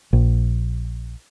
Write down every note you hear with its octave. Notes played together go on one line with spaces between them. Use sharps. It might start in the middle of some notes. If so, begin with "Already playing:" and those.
A#1